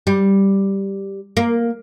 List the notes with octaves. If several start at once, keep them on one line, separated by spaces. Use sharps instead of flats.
G3
A#3